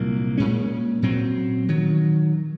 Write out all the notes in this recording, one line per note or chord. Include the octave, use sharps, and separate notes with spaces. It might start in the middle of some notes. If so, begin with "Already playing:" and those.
Already playing: C2 A#2 F#3 A#3
A#2 G#3 C#4
A#2 F#3 C4
D#3 F#3